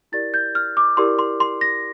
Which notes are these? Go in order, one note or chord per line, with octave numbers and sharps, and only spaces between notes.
E4 G4 A#4 D5 A6
G6
F6
D6
E4 G4 A#4 D5 C6
C6
C6
A#6